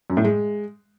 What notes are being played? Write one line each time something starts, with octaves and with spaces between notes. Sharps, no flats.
F#2
A2
G#3